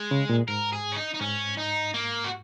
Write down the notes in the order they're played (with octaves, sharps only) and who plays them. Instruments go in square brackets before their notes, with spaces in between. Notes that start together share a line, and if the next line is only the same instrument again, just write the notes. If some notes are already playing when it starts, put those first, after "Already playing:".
Already playing: [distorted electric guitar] G#3
[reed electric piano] C#3
A#2
[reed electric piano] G#2 [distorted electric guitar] A#4
[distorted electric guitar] G#4
C#4
D#4
D#4
[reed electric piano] G#2 [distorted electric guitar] C#4
[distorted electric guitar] D#4
A#3
F#4